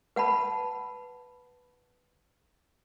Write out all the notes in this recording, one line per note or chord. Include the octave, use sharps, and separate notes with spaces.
B4 F#5 A5 B5